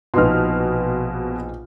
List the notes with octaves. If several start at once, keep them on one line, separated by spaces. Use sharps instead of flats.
A#1 B2 B3 D#4 C6 F6